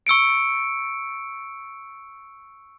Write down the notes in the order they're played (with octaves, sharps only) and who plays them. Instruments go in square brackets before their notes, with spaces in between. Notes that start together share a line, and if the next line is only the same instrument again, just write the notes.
[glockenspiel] C#6 E6 C#7 D7